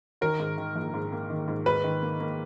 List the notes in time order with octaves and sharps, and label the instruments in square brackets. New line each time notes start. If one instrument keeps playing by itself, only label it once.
[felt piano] D#3 [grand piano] A#4
[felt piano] G#2
D#3
A#1
G#2
A#3
D#3
G#2
[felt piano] G#2 [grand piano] B4
[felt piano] D#3
A#3
A#3